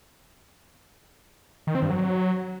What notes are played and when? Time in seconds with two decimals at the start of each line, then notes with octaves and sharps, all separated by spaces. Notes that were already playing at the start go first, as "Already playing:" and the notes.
1.67 D#3
1.75 C4
1.83 G2
1.90 F#3